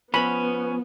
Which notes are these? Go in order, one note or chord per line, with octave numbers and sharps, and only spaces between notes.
F3 B3 C#4 B4 B5